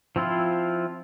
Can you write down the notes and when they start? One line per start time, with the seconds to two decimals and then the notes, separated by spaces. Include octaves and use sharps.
0.16 F3 C4 E4 F4